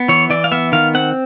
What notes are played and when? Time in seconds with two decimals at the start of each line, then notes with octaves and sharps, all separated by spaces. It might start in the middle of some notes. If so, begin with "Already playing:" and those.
Already playing: B3
0.08 E3 C#5
0.30 E3 D5
0.44 F5
0.52 B3 E5
0.72 D#3 F5
0.95 C4 F#5